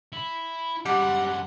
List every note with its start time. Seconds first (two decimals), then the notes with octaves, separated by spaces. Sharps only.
0.12 E4
0.85 F#2 G3 G#3 F#5